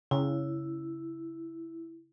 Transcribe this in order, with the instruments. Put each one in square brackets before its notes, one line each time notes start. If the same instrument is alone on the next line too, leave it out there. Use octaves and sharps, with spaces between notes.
[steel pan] C#3 [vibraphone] E4